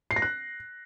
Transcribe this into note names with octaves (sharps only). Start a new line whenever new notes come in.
C7
A#6
F#6